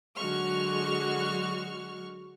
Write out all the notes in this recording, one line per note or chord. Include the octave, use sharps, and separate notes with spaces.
D3 F#3 G#3 F#4 C#6 F6